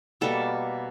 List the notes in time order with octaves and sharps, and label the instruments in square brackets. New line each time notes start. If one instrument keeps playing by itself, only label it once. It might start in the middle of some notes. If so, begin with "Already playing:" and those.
[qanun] B2 G3 A#3 A4